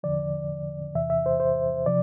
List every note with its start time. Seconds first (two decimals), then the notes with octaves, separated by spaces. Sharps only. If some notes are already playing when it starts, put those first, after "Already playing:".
0.03 E2 D3 F3 D5
0.95 E2 C3 E3 E5
1.10 E5
1.26 C5
1.40 C5
1.86 C3 F3 D5